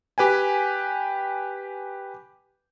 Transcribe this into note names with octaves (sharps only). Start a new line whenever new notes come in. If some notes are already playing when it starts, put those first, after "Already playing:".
G4 B4 G5 G#5